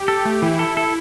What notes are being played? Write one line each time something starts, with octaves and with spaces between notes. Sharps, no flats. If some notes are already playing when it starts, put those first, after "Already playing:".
Already playing: G4
A4
A3
E3 E4
A4
A4